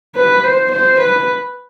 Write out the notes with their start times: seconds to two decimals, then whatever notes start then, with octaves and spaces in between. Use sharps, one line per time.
0.15 B4
0.44 C5
0.72 C5
1.00 B4